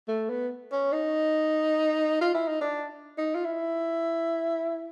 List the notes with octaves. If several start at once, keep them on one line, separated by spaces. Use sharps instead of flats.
A3
B3
C#4
D#4
F4
E4
D#4
D4
D#4
F4
E4